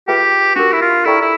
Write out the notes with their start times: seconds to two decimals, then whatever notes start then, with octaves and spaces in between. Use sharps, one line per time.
0.08 F4 G4 G#4 B4 E5 G5
0.56 D4 F#4 G4 A#4
0.72 E4
0.82 F4
1.05 E4 A4 D5 G5 A#5 C#6
1.22 E4